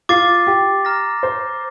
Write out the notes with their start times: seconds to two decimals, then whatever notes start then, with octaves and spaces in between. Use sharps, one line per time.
0.09 F4 D6 A6 C7
0.47 G4
0.85 A#5 F6 A#6
1.23 C5